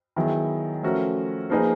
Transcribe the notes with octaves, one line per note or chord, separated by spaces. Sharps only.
D#3 F#3 B3 E4 G#4
F3 A3 C#4 F#4 A#4
F3 A#3 D#4 G#4 B4